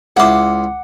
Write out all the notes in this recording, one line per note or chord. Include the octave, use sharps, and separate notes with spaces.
C#2 E4 F#5 C6 D6